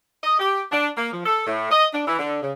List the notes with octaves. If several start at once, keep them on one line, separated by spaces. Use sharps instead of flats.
D#5
G4
D4
A#3
F3
A4
A2
D#5
D4
E3
D3
C#3